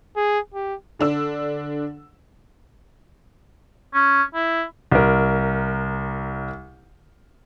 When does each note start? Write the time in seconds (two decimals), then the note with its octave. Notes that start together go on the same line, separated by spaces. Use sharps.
0.16 G#4
0.54 G4
0.99 D3 D4 E6
3.94 C#4
4.35 E4
4.92 C2 A#4